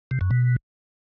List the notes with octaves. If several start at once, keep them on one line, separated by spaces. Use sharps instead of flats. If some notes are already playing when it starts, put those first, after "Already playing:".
C3
F#2
B2